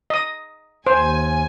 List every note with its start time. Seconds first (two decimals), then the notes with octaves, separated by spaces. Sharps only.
0.10 D#5 D#6
0.87 D#2 C5 G#5